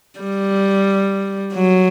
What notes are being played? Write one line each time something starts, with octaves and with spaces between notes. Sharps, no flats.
G3
F#3